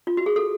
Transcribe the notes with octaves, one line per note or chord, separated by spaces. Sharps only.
F4
F#4
G#4
A4